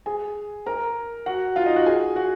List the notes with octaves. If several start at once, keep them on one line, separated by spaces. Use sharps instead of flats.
G#4 G#5
A#4 A#5
F#4 F#5
F4 F5
D#4 D#5
F#4 F#5
G#4 G#5
F#4 F#5